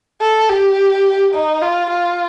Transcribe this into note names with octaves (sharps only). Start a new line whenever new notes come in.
A4
G4
D#4
F4
F4